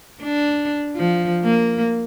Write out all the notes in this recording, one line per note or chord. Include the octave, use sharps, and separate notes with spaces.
D4
F3
A#3